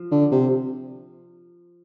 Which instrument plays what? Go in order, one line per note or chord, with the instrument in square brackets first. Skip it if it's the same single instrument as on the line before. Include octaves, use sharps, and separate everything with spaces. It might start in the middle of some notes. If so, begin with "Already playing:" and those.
Already playing: [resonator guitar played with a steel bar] F3
[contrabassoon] D3
C3